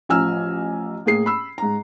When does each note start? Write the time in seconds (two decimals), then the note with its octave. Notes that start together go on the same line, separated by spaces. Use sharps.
0.09 A1 F3 G#5 A#5 E6 F6
1.06 A2 A#3 G#4 C7
1.26 B5 E6
1.58 G#2 A#5